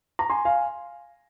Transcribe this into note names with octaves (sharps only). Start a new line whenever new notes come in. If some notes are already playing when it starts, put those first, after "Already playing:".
A#5
G#5 C6
F5 G#5